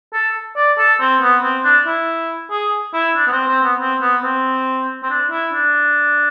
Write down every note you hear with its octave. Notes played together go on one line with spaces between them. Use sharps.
A4
D5
A4
C4
B3
C4
D4
E4
G#4
E4
D4
B3
C4
C4
B3
C4
B3
C4
C4
D4
E4
D4